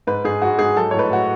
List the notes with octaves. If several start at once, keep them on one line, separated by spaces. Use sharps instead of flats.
G#2 B4
G#2 G#4
G#2 F#4
G#2 G#4
F#3 A4
C#5
A2
B4
A2 F#4